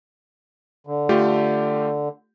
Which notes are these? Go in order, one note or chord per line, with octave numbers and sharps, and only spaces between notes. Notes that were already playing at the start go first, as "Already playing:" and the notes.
D3
A3 F4 G4